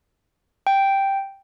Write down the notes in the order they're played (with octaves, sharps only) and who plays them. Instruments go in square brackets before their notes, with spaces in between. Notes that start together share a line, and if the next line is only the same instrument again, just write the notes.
[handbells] G5